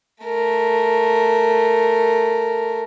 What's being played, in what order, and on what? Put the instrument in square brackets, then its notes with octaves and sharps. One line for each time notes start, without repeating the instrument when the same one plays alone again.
[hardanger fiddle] A3 A#4